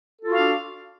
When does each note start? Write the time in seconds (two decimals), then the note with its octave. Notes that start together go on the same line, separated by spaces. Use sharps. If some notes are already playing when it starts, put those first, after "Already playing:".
0.21 A4
0.25 F4
0.29 F#4
0.34 F5
0.38 D4